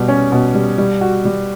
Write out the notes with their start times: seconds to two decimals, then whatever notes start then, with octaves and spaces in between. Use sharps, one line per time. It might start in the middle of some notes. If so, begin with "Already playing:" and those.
Already playing: B2 G3
0.08 C#4
0.32 B2
0.55 G3
0.78 G3
1.01 F#4
1.25 G3